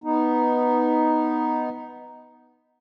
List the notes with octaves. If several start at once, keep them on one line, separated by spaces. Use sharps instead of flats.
B3 D#4